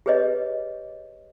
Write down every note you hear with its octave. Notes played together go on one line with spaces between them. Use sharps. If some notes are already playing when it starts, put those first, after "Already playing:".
G4 G#4 B4 C#5 D#5